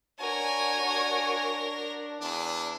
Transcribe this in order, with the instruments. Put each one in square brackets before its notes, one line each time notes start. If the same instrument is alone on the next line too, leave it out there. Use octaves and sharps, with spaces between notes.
[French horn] D4 [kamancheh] F#4 C#5 [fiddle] A#4 [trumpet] G#5
[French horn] D4
[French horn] E2 [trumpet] D4